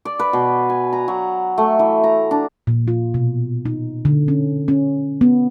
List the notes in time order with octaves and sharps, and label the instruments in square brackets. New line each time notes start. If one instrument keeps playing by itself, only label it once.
[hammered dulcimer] D5
B4
B2
G#5
A#5
F#3
A3
E3
A#5
D4
[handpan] A#2
F4
B2
D#4
D3
C#4
C#4
B3